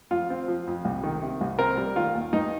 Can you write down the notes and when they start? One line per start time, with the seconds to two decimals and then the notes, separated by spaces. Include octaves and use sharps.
0.11 F2 F4
0.30 C4
0.48 F3
0.67 F2
0.85 C2
1.04 D#3
1.22 C3
1.41 C2
1.59 C4 A#4
1.78 G3
1.96 D#3 F4
2.15 D#2
2.33 G2 D#4